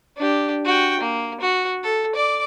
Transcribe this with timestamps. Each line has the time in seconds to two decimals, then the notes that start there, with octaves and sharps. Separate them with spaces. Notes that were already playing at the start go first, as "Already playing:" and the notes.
0.17 D4 G4
0.66 F#4 G5
1.01 A#3
1.41 F#4
1.84 A4
2.15 D5 D6